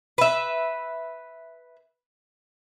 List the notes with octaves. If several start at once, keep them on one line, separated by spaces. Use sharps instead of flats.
B4 E5